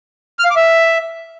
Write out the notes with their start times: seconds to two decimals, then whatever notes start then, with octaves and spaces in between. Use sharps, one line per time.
0.39 F6
0.45 F5
0.50 D6
0.56 E5